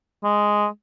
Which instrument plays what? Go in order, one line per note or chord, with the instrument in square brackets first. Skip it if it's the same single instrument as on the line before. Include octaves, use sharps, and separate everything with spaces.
[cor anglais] G#3